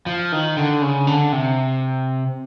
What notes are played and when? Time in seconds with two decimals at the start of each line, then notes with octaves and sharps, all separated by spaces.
0.06 F3
0.32 D#3
0.57 D3
0.82 C#3
1.07 D3
1.32 C3